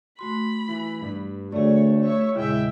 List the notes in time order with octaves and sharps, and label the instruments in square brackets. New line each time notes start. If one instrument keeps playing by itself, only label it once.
[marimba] A3 F#4 C6 [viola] B5
[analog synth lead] E3
G2
[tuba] D2 [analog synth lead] A3 [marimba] G#4 D5 [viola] C#5
[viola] C#5 E5
[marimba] E2 A#2 C#3 [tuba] G#3 [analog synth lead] E4 [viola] E5 G5